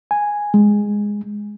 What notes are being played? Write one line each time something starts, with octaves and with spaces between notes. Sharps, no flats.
G#5
G#3